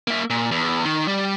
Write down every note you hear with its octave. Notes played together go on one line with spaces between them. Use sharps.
A#3 E5
A#2
E2
D#3
G3